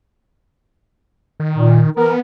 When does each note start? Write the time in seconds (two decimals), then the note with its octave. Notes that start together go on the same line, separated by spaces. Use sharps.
1.40 D#3
1.56 A#2
1.97 E3 B3 A#4